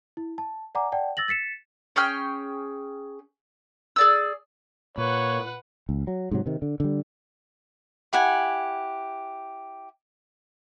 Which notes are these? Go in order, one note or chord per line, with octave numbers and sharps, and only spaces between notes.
E4
A5
D5 F#5 G#5 A#5 D6
D5 F#5 G5 A5
E6 A6 A#6 F#7
A6 B6 C#7 E7
C#4 G#4 G5 F6
G#4 D5 E6
A#2 B4 C#5 F#5
C#2
F#3
G#2 C3 F#3
C3 D#3
D3
D3 G3
E4 G4 F#5 G#5